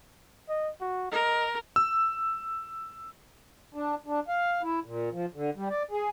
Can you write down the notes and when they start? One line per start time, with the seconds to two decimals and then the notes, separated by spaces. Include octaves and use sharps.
0.49 D#5
0.81 F#4
1.11 A#4 D#5
1.76 E6
3.74 D4
4.06 D4
4.28 F5
4.63 E4
4.84 A#2
5.12 F3
5.34 D3
5.56 G3
5.70 D5
5.91 G#4